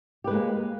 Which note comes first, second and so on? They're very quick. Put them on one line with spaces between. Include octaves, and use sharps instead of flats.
G4 B4 G#3 A#3